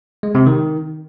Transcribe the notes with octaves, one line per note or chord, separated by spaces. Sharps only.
G#3
C3
D#3